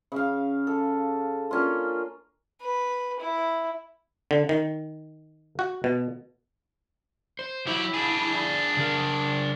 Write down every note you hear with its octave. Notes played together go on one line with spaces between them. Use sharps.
C#3 F5
A4
A#3 C#4 D4 F4
B4
E4
D3
D#3
F#4
B2
C5
F#3 E4 G4
D4 G#4
C#3 A#4